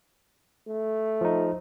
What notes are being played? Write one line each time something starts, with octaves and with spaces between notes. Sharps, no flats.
A3
F3 D#4